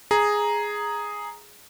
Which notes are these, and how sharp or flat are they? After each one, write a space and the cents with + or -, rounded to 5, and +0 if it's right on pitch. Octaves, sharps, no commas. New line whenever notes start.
G#4 +0 A#5 +0